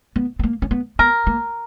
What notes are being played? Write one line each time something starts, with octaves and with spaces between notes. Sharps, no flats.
B3
B3
A#3
C#4
B3
B3 A#4
A#3